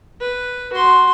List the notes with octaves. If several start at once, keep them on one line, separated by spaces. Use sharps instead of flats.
B4
F#4 C6